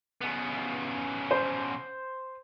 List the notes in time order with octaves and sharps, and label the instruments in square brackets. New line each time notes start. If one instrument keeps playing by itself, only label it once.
[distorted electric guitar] C#3 B3
[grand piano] C5